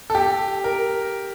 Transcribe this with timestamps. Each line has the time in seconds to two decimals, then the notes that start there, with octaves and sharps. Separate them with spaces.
0.10 A4
0.15 G4
0.64 A#4